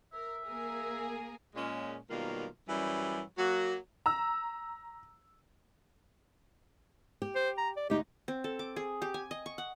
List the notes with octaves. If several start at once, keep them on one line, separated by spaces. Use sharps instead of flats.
A#4 E5
A#3 G#4 A#4
A#2 G#3 C#4
B2 D#3 F#3 G3 A#3 F4
F#2 E3 F#3 G3
F#3 A#3 F#4
A#5 E6
G4
C5
A#5
D5
D2 D#4 G4
C4
A4
D6
G#4
G4
G#5
D#5
C#6
F#5